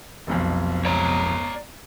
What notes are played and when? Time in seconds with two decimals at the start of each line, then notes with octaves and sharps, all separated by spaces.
0.27 F1 B1 F2
0.85 C#5 D5 A#5